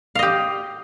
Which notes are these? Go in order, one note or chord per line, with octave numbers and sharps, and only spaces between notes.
G4 D#5 F5